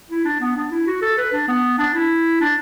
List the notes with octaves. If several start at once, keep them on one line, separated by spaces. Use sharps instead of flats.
E4
D4
B3
D4
E4
F#4
A4
B4
D4
B3
D4
E4
D4